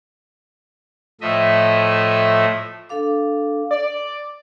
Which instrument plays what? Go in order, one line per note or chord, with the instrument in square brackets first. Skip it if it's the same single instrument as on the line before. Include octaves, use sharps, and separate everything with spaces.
[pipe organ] A2 F3 A3 D#5 E5
[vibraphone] D4 A4 F5 D6
[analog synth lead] D5